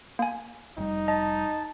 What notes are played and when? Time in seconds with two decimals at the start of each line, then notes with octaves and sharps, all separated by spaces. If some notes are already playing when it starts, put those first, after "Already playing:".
0.19 A#3 G#5
0.78 F1 G3 D#4
1.08 D#5 A5